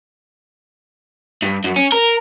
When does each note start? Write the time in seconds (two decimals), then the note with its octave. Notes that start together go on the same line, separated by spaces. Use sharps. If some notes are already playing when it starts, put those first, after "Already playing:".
1.43 G2
1.65 F#2
1.76 C#4
1.92 A#4